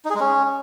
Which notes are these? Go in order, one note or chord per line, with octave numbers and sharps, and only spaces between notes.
D#4
G#4
G#3
C#4